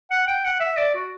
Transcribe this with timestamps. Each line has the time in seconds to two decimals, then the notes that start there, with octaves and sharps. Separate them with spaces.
0.11 F#5
0.27 G5
0.44 F#5
0.60 E5
0.77 D5
0.94 F#4